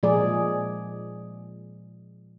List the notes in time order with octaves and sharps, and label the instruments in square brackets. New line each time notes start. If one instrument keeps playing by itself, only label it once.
[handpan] A#2 F3 G#3 G#4 D5